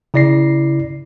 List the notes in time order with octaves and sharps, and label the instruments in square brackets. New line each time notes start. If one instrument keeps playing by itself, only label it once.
[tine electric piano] C#3 E4 D5 A#6 C7